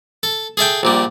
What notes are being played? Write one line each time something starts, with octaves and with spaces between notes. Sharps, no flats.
A4
G#4 A4 E5 G5
A#1 A#2 G3